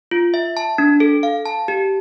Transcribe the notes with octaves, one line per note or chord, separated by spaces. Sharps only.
F4
E5
A5
D4
A4
F5
A5
G4